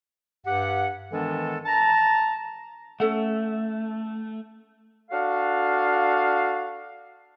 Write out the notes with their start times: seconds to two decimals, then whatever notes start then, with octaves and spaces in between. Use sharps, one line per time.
0.45 G2 G4 F#5
1.12 D#3 E3 G#3 B3 D4 A4
1.66 A5 A#5
3.00 A3 C#4 A4 F#5
5.11 D4 F#4 A4 F5